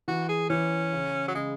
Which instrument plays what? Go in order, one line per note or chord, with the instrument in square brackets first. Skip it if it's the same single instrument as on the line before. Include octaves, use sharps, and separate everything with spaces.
[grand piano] E3 [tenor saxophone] F#4
[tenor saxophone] G#4
[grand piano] E3 [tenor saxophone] C#4
[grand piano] C#3
[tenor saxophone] F#3
[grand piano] C#3 [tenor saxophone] G#3